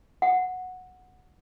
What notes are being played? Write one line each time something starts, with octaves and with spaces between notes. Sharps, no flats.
F#5